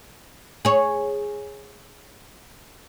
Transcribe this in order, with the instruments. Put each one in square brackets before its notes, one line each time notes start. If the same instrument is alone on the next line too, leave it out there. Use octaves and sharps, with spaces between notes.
[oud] G#4 C#5